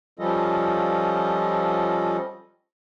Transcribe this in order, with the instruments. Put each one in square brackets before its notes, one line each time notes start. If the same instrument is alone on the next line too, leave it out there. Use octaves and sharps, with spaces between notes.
[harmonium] F3 G3 C#4 F4 A4 D#5